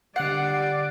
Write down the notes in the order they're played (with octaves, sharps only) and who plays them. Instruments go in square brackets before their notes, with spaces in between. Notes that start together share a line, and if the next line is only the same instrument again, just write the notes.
[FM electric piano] D3 F#6 C7 [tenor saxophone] G3 [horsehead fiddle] D5 [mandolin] F#5